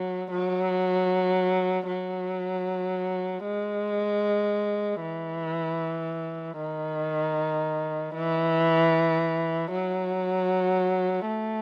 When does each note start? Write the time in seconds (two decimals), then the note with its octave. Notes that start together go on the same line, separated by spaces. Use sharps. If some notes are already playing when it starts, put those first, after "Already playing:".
Already playing: F#3
0.31 F#3
1.88 F#3
3.45 G#3
5.01 E3
6.58 D#3
8.14 E3
9.71 F#3
11.27 A3